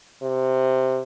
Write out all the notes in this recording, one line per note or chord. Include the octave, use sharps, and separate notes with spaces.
C3